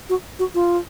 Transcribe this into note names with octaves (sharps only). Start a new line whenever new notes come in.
F#4
F#4
F4